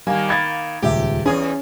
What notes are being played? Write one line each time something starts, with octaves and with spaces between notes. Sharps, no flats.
D#3 G3 A#3 G#5
B5 G#6 A6
D#1 C#2 G4 E5
E2 C3 C#4 G#4